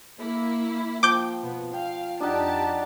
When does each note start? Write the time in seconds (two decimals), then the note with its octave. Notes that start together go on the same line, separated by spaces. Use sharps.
0.19 A#3 E4
1.03 F3 G5 D6 G6 D7
1.42 B2 B3
1.73 F5 G5
2.20 F2 D4 D#4 G4 F#5 A5